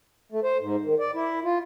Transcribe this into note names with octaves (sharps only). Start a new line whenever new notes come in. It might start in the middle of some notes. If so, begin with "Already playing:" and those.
A3
C5
G#2
D#3
D5
E4
F4